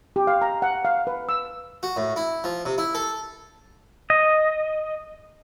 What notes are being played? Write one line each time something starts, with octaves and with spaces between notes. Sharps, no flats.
G4
F5
A#5
F#5
F5
B4
E6
F#4
A2
E4
F3
C3
E4
A4
D#5